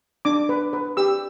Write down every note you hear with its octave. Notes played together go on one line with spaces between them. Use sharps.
D4 D6
B4
B4
G4 E6